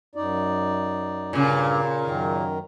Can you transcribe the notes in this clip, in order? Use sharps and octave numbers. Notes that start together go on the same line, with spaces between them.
F#2 D#4 D5
G2 A#2 C#3 G4
F#2 D#3 A#4